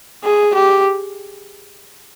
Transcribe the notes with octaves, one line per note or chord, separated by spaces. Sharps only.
G#4
G4